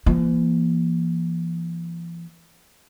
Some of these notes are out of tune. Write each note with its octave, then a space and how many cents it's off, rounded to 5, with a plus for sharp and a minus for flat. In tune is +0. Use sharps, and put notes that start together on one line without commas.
E3 +45 A#3 +20